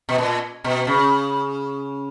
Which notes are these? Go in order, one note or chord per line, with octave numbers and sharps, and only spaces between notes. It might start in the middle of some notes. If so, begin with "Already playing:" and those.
B2
A#2
B2
C#3